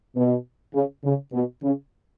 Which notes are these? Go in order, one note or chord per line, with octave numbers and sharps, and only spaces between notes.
B2
C#3
C#3
B2
C#3